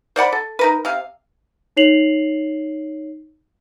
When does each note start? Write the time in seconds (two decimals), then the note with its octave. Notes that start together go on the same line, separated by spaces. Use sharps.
0.16 C5 D5 F#5 B5
0.32 A4
0.59 D#4 A#4 B4
0.85 C3 F5
1.77 D#4 C#5 C7 F7 F#7